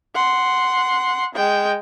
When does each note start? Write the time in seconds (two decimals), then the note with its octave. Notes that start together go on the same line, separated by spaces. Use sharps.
0.15 F#5 C6
1.35 G#3 G5